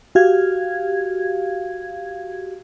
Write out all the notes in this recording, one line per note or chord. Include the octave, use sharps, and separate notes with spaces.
F#4 G4 F5 G#6